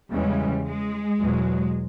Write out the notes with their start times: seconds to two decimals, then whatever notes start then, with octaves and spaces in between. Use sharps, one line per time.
0.10 E2 C#3 E3 G3 G#3 C#4
0.66 G#3
1.21 E2 B2 F#3